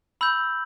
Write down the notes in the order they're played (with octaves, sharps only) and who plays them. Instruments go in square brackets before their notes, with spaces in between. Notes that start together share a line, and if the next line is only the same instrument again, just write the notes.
[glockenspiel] B5 E6 G6 F#7